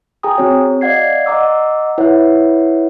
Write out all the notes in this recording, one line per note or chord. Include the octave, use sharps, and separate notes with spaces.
G#4 G5 G#5 A#5 D#6
C4 F#4 C#5
D5 D#5 F5 F#5 G#6 C7
D#5 F#5 A#5 D6 E6
E4 B4 C#5 E5 F#5